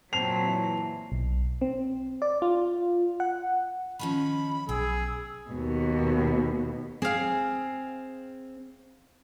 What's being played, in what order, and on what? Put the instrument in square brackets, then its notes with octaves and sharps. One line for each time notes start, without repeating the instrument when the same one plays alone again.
[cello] A#2 F#3 [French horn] C4 [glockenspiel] A5 C7 [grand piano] F7
[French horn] E3
[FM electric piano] B1
C4
D5
F4
F#5
[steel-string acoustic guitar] D#3 F3 C#4 [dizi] B5
[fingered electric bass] B1 [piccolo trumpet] G#4 [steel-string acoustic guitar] G5 [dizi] E6
[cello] D#2 B2
[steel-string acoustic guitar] C4 [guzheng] G#4 F5